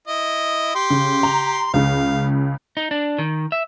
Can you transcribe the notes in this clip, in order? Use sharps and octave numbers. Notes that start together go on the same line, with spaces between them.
E4 D#5
G4 C6
C#3
A#5
C#2 C#3 F5
D#4
D4
D#3
E5